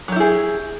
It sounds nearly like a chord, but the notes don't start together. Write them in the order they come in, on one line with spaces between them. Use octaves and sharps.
F#3 G4 E4 G#4